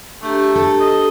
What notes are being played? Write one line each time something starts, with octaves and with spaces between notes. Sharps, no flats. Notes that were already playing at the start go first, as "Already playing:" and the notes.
A3 D4 G4 A#5
A4
D#5